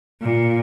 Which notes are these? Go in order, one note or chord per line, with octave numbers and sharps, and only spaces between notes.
A#2